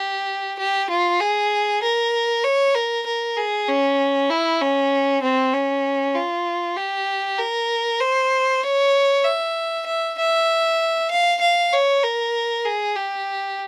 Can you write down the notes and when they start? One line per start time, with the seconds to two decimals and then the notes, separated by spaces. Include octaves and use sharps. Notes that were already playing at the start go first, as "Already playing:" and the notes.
Already playing: G4
0.59 G4
0.90 F4
1.20 G#4
1.82 A#4
2.44 C#5
2.75 A#4
3.06 A#4
3.37 G#4
3.68 C#4
4.30 E4
4.61 C#4
5.22 C4
5.53 C#4
6.15 F4
6.77 G4
7.39 A#4
8.00 C5
8.63 C#5
9.24 E5
9.86 E5
10.18 E5
11.11 F5
11.41 F5
11.73 C#5
12.03 A#4
12.65 G#4
12.95 G4